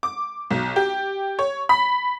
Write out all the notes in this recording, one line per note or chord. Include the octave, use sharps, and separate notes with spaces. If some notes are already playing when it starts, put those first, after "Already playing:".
D6
B1
G4
C#5
B5